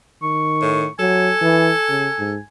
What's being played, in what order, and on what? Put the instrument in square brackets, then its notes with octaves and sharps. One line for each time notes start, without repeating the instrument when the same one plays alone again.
[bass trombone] D#3 [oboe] C#6
[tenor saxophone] A2
[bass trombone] F#3 [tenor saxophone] A4 [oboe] G#5
[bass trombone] E3
C#3
G#2